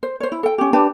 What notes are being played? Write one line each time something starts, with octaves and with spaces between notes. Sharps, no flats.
C5
C5 C#5
E4
A4 G5
C#4 G4
D4 G4 B4 A5